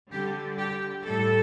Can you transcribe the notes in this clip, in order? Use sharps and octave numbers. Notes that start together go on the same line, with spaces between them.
D3 G3 G4
G4
A2 G3 A4